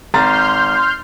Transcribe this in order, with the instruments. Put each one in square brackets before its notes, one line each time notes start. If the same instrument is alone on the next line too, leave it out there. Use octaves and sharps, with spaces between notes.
[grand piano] G#1 A#5 A6 [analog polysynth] C6 F6 G6